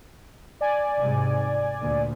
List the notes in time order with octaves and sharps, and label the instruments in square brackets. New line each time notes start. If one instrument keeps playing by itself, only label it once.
[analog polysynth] D5 G#5
[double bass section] G#2 C3
D2 A#2